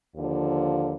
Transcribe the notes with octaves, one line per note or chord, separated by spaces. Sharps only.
D#2 D3 F3